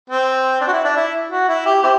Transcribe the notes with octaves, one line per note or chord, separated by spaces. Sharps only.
C4
D4
F#4
E4
D4
E4
F#4
E4
G4
C4 E4 G4